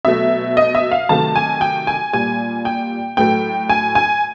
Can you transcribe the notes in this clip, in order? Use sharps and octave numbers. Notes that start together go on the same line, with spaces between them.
B2 F#3 A3 E5
D#5
E5
F5
C3 D#3 F#3 A3 A5
G#5
G5
G#5
A#2 G3 G#5
G5
A2 F#3 A3 G5
G#5
G#5